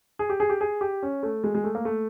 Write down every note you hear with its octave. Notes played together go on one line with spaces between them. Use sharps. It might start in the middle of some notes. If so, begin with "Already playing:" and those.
G#4
G4
G#4
G4
G#4
G4
C#4
A3
G#3
G#3
A3
A#3
A3